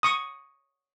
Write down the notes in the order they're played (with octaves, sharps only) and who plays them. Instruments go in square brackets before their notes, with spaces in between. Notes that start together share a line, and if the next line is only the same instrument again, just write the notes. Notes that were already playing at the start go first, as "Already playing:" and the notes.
[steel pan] C#6 D#6